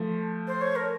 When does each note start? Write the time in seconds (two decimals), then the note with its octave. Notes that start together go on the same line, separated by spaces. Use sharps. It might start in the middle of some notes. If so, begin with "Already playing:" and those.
Already playing: F3 A3
0.47 C5
0.61 C#5
0.76 A#4